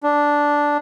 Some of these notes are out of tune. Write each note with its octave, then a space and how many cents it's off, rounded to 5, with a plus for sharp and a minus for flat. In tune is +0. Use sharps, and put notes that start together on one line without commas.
D4 -5